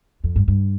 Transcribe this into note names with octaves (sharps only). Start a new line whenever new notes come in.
F2
G2
G2